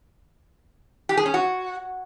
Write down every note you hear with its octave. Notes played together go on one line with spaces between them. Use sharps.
G4
G#4
C#4
F#4